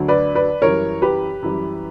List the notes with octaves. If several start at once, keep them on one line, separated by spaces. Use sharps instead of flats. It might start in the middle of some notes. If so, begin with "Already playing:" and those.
Already playing: D2 D3 F#3
B4 D5
B4 D5
F#2 E3 G3 A#4 C#5
G4 B4
F#2 E3 G3